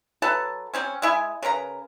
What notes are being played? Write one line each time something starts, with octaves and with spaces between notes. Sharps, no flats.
F#3 A4 B4 A5
G3 C4 C#4
G#3 E4 G#5
C#3 A#4 B4 A#5